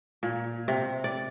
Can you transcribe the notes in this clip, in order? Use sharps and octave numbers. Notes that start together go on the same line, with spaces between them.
A#2
C3
D5